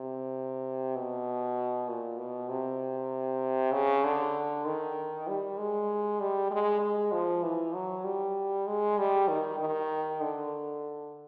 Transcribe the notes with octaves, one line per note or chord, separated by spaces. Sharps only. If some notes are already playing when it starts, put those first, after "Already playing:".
Already playing: C3
B2
A#2
B2
C3
C#3
D3
D#3
G3
G#3
G3
G#3
G#3
F3
E3
F#3
G3
G#3
G3
D#3
D#3
D3